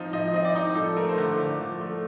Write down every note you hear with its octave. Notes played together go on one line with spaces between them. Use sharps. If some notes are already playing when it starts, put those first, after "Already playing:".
Already playing: F3 C4 D#4
F3 D#5
C4 D#5
D5
D#4
F3 A4
A3 A#4
C5
D3 A#4
D3 D5
F3
A3